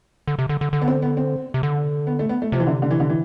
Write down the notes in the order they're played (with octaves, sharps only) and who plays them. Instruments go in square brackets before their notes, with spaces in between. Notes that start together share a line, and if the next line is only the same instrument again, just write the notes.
[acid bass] D3
C3
D3
D3
D3
[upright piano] B3
C4
B3
C4
[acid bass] C3
D3
[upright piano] B3
A3
B3
A3
[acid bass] C3 [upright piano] F3
[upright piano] E3
D3
D3
E3
D3
E3